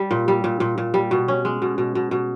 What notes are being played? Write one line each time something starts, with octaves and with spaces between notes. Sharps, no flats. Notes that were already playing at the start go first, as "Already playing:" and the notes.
Already playing: G3
A#2
G3
A#2
A#2
A#2
G3
B2
C#4
G#3
B2
B2
B2
B2